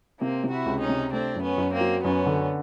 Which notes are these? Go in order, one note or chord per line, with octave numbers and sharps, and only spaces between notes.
C3 A#3 C4
C3
E4 F#4
C#2
C#4 D#4
C3
A3 C4 D4
F#2
B3 C#4
F#2
A#3 C4
F#3
F#2 B3 C#4
D3